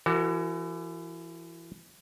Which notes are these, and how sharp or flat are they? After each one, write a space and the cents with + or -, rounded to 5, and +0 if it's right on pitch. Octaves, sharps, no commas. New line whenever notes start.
E3 +30 F#4 +15 A#4 -45